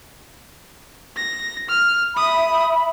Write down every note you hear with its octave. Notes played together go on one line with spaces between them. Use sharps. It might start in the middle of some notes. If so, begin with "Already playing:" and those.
A#6
F6
E5 B5 D#6